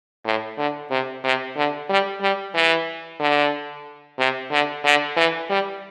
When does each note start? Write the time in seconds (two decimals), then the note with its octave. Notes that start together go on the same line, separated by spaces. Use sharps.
0.25 A2
0.58 D3
0.90 C3
1.24 C3
1.57 D3
1.89 G3
2.21 G3
2.54 E3
3.20 D3
4.18 C3
4.51 D3
4.84 D3
5.16 E3
5.49 G3